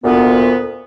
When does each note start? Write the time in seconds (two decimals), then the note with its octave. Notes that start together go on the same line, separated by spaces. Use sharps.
0.04 D2 A#2 B3